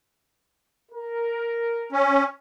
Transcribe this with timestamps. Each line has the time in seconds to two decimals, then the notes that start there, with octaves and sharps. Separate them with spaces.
0.92 A#4
1.92 C#4